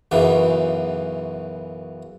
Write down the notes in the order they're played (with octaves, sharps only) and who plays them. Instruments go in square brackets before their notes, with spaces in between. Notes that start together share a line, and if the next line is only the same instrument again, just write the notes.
[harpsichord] B1 F#2 C#3 E3